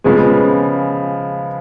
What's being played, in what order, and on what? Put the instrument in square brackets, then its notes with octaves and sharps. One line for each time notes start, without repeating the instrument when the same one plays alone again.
[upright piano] C#3 F3 G#3 B3